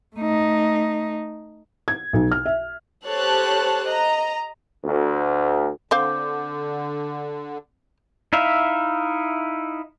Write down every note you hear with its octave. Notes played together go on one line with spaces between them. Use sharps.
A3 D#4
G#6
B1
F6
E5
G4 A4 C5 C#5 A5 F#6
D#5 A#5
D2
D3 C4 C5 F5 D6 G6
D#4 E4 E5 F5